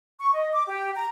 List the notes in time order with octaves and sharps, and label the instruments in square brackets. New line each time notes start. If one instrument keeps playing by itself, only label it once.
[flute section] C#6
D#5
D6
G4
A#5